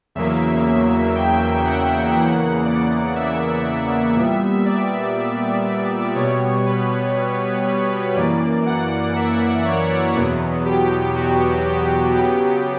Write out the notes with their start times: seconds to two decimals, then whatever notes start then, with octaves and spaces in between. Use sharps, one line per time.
0.15 E2 C#3 F#3 A#3 E5
1.16 G5
1.65 F#5
2.15 E2 C#3 E3 A#3 F#5
2.65 D5
3.16 E5
4.16 A#2 G3 B3
4.65 D5
6.15 B2 G3 B3 C#5
6.66 B4
7.66 C#5
8.15 F#2 E3 A#3 D5
8.66 F#5
9.16 E5
9.65 C#5
10.16 E2 B2 F#3 B3
10.66 G4
11.15 F#4
11.65 G4
12.15 C#3 F#3 B3 G4